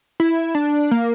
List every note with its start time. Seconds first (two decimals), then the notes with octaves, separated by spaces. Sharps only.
0.20 E4
0.55 D4
0.91 A#3